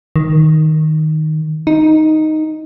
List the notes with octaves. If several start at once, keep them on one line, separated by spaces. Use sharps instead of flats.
D#3
D#4